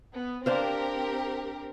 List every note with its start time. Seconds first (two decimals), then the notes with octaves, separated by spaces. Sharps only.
0.15 B3
0.46 C4 D4 G4 A#4 C5 F5